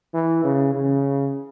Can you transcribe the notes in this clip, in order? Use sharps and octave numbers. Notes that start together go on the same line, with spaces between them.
E3
C#3
C#3